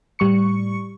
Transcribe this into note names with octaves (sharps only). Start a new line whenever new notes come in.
A2 G3 C#6 C#7